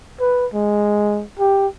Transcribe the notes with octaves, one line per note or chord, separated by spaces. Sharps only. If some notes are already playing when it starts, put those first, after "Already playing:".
B4
G#3
G4